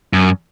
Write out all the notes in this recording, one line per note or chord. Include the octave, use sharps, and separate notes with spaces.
F#2